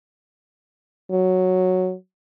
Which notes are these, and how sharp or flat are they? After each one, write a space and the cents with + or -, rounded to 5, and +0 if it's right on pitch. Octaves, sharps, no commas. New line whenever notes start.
F#3 -5